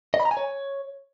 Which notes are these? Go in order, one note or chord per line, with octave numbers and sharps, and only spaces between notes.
D#5
B5
A#5
G#5
C#5